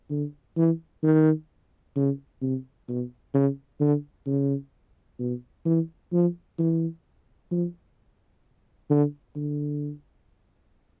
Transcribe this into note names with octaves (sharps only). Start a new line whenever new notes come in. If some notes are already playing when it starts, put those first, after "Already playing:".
D3
E3
D#3
C#3
C3
B2
C#3
D3
C#3
B2
E3
F3
E3
F3
D3
D3